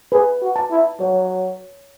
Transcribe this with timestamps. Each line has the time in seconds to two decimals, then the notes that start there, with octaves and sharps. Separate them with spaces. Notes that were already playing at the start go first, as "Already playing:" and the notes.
0.12 G#4 B4
0.42 F#4
0.56 A5
0.71 E4
0.99 F#3 C#5